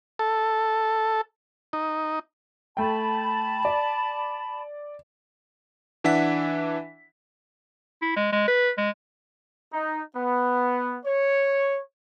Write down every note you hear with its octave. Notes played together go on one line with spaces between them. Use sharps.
A4
D#4
A3 G5 A5 B5
D5
E3 D4 E5 F#5 B6
E4
G#3
G#3
B4
G#3
D#4
B3
C#5